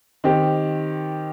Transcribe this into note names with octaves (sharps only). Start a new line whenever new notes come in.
D#3 C4 G4